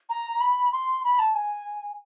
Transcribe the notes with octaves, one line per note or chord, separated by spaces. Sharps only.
A#5
B5
C6
B5
A5
G#5